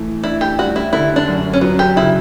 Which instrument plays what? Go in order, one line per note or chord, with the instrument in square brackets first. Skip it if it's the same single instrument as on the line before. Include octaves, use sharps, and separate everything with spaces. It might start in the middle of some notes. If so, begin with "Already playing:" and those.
Already playing: [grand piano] E3 A3
[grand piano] D4 [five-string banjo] E4
[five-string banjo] G4
[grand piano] G3 [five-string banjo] F#4
[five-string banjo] E4
[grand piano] D3 [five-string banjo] E4
[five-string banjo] D4
[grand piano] F#2
[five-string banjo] C#4
[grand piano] F#3 [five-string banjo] B3
[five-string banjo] G4
[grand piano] C#3 [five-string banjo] E4